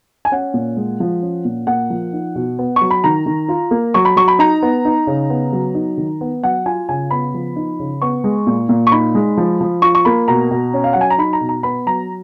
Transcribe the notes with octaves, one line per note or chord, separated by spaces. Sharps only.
G#5
C#4 F#5
A#2
G#3
F3
C#4
A#2
A#3 F#5
F3
D#4
B2
B3
C#6
F#3
B5
D#3 A#5
D#3
F4
A#3
F#3 C#6
B5
F#3 C#6
B5
D#4 A#5
B3
D#4
C#3
B3
F#3
D#4
D#3
B3
F#3 F#5
F4 G#5
C#3 G#5
B3 B5
F3
D#4
C#3
B3 C#6
G#3
A#2
A#2
C#6
D#4 B5
G#3
F3
F3
F4 C#6
C#6
A#3 B5
B2 A#5
B2
C#4
F5
F#3 F#5
G#5
A#5
D#4 B5
A#5
B2
A#5
B3 B5
F#3 A#5